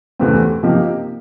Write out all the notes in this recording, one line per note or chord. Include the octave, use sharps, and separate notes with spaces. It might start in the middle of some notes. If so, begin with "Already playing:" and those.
E2 C3 E3 A3 C4
C3 F3 A#3 D#4 G4